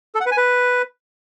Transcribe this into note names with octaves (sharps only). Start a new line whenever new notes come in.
A4
F#5
B4
G#5
B4